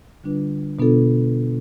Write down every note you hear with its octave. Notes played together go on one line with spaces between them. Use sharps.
D3 G3 D4 F4 B4
B2 B3 D4 F4 A4